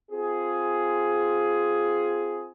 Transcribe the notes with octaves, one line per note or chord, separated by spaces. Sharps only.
C4 F4 G#4